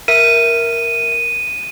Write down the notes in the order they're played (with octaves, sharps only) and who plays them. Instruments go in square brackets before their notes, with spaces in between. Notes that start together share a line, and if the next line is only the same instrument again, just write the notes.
[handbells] A#4 E5 [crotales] D#7